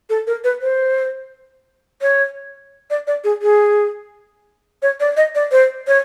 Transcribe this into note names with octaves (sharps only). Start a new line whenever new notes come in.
A4
A#4
B4
C5
C#5
D5
D5
G#4
G#4
C#5
D5
D#5
D5
C5
C#5